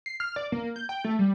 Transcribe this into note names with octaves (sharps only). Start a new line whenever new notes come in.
C7
F6
D5
A#3
G6
G5
A3
G3